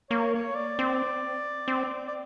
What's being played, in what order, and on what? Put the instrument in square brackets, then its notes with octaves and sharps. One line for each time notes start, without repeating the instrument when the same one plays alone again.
[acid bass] A#3 [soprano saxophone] C#5
[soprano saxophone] C#5
D5
[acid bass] C4
C4
[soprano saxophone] D5